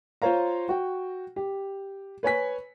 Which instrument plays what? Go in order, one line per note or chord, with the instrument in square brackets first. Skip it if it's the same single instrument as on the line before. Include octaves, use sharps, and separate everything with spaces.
[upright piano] F4 C5 C#5 F5 A#5
F#4 G5
G4
B4 C#5 G#5 B6